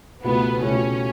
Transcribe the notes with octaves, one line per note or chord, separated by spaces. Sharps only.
C#2 B2 A3 B3 E4 G4
C#2 B2 A3 C#4 E4 G4